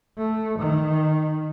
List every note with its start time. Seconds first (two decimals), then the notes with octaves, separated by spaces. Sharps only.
0.17 A3
0.59 D#3